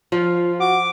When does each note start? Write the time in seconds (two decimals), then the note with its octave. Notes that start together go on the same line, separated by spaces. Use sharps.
0.12 F3 F4
0.60 F#4 D6